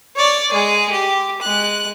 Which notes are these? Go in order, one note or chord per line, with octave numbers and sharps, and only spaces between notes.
C#5 D5
G#3 G#4
G4
G#3 F#6